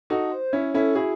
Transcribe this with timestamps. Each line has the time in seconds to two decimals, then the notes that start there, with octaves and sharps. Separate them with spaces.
0.10 D#4 F#4 A4
0.32 C5
0.53 C#4 E4 C#5
0.74 C#4 E4 A4
0.95 E4 F#4 G#4